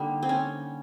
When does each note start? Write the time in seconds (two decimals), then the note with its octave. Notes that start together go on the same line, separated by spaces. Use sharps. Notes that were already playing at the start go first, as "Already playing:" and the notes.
Already playing: D3 G3 A#3 D#4
0.23 C4
0.29 C#4